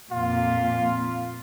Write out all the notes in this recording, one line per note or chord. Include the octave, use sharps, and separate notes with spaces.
F2 A#2 F4